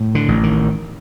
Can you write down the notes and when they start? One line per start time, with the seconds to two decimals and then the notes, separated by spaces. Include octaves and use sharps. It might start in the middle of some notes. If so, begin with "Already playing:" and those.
Already playing: A2
0.15 D3
0.28 A1
0.43 D#3